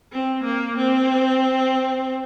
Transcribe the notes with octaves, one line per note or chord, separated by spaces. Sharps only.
C4
A#3
C4